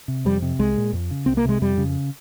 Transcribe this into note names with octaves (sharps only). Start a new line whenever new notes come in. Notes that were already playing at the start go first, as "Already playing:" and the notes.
C3
F2 G3
C3
C2 G#3
A#2
F2
C#3
C2 C4
A#3
C3 G#3
F2 G3
C#3